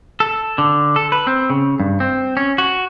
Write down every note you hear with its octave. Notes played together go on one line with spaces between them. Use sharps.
A4
D3
A4
B4
C4
C#3
G2
C4
C#4
F#4